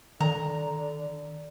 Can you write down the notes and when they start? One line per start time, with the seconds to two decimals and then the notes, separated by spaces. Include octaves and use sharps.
0.21 D3 D#3 A#5